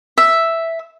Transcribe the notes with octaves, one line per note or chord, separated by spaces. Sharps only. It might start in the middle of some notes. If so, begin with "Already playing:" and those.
E5